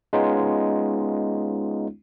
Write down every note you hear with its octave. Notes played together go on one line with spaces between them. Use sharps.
G#3 B3 C#4 D#4 F4